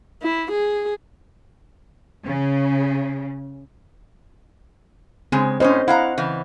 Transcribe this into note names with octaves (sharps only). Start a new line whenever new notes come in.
E4
G#4
C#3
C#3 G#3 C4
A2 C4 C#4 C5 D#5
E4 F5 F#5 A#5
C#3 E3